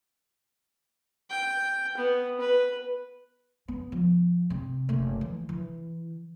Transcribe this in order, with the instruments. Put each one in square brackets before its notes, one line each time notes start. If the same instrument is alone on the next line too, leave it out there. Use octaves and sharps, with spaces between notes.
[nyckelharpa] G5
B3
B4
[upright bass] B3
F3
C3
F#1 A3
E3
E3